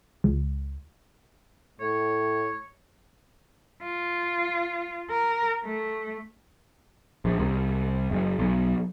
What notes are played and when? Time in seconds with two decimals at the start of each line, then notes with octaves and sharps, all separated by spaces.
0.24 C#2
1.80 A2 C#5
3.83 F4
5.11 A#4
5.65 A3
7.25 A#1
7.39 C2
8.11 F#1
8.39 B1